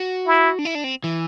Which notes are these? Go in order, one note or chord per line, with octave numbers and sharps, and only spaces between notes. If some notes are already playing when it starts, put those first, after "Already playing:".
Already playing: F#4
E4
D4
E4
D4
C4
E3